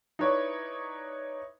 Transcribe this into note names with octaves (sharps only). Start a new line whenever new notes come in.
D#4 E4 B4 C#5 D5 C#6